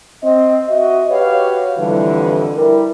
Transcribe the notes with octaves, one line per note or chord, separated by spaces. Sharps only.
C4 D#5
F#4 D#5 E5
F#4 G4 B4 C#5 F5
F2 A2 D3 E3 G3
G3 E4 A#4